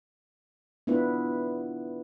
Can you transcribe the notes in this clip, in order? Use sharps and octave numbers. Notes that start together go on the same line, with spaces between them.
B3 D4 E4 F4 B4